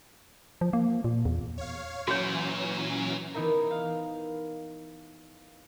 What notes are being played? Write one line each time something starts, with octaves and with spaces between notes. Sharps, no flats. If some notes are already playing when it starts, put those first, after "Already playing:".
F3
A#3
A#2
E2
C#5 F5
A#2 E3 F#3 C#4 F#4 C#5
E3 B3 D#4 E4 A#4
F5